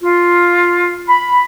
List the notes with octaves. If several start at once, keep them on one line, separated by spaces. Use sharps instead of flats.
F4
B5